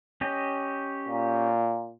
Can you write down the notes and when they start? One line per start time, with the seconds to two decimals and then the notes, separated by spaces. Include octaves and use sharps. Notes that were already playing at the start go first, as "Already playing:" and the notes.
0.21 C#4 G4 D#5
1.09 A#2